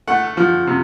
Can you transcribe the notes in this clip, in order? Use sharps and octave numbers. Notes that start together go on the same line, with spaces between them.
A3 F#5
F3
C3